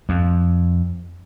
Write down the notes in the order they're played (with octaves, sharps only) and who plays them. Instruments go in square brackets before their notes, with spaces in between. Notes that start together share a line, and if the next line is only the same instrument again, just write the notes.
[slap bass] F2